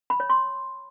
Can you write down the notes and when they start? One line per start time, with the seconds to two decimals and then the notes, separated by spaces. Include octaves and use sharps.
0.10 B5
0.20 C#5
0.30 C6